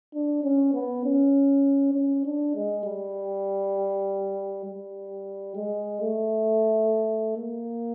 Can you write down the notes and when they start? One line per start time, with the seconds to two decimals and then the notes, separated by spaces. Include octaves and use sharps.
0.14 D4
0.43 C#4
0.74 B3
1.05 C#4
1.94 C#4
2.25 D4
2.55 G#3
2.84 G3
4.65 G3
5.56 G#3
6.01 A3
7.37 A#3